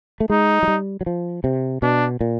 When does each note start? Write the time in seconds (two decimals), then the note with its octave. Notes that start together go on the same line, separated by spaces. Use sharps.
0.20 A3
0.30 G#3 D#4
0.63 F#3
0.68 G3
1.01 F#3
1.06 F3
1.44 C3
1.82 B2 D4
2.21 A#2